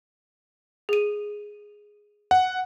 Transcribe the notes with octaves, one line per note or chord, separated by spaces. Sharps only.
G#4 D#7
F#5